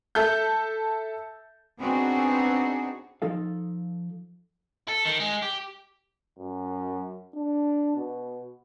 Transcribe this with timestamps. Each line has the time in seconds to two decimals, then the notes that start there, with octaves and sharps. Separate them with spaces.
0.15 A4 E5 G6
1.79 B3 C4 D4 D#4 F#4 G#4
3.22 F3 D#4 A4 F5
4.88 A4
5.05 D#3
5.20 G#3
5.42 G4
6.39 F#2
7.35 D4
7.96 B2